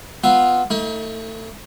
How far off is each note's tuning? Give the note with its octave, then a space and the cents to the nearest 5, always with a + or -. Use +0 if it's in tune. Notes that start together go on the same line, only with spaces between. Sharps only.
B3 +0 F4 +0 E5 -5
A3 +25 D#4 +45